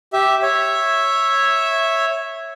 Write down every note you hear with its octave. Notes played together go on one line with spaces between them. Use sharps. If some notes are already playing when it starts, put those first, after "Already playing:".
G4 E5
C#5 E5